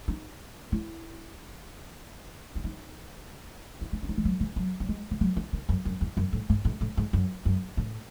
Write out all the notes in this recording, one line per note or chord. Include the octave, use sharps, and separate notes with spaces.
D#4
E4
E4
D#4
E4
D#4
C#4
D#4
E3
F#3
E3
F#3
F#3
G#3
E3
F#3
E3
D#3
F#2
F#2
E2
F#2
A2
G#2
A2
A2
G#2
F#2
F#2
A2